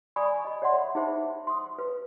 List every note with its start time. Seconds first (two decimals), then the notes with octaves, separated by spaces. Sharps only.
0.16 D5 G#5 B5 C#6 D#6
0.45 D#5 B5
0.62 C#5 D5 E5 F#5 C6
0.95 D#4 G#4 C5 E5 B5
1.47 C6 D#6
1.78 B4